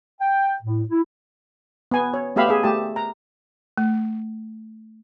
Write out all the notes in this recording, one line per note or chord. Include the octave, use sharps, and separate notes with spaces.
G5
A2
E4
B3 G#5
C#5
A3 B3 G4 E5 F5 B5
G#4 E5
A3 G4 A5
A#5
A3